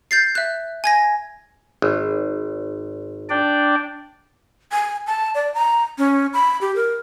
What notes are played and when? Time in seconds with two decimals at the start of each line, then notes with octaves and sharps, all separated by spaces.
0.11 G6 A6 C7
0.35 E5 F#6
0.84 G#5 G#6 A#6
1.82 G#1
3.30 D4 D5 G5
4.72 G#5
5.07 A5
5.35 D5
5.54 A#5
5.98 C#4
6.33 B5
6.61 G4
6.76 A#4